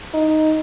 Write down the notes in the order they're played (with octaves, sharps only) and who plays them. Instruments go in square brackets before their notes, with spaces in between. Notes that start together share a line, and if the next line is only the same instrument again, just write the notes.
[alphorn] D#4